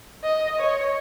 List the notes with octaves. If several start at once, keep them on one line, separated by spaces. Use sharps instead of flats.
D#5
C#5